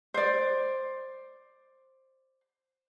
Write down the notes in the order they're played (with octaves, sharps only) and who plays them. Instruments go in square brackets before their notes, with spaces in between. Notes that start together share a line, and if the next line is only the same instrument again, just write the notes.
[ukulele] C5 D5